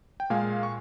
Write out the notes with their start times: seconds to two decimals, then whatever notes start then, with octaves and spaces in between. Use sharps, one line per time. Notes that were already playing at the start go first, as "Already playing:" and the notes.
0.20 G5
0.30 A#2 G#3 F5 G#5
0.63 C#6